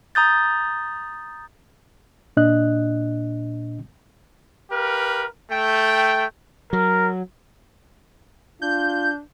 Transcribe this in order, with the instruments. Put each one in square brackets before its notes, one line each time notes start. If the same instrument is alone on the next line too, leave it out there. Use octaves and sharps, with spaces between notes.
[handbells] A#5 D#6 G6 A6
[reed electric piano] A#2 D4 D#5 F#6
[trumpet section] G4 A#4 B4 F5
A3 G5
[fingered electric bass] F#3 [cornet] A#4
[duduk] D4 [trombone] F4 [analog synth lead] G6